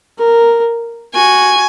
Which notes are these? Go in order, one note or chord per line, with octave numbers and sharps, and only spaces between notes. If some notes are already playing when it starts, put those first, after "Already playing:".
A#4
F#4 G#5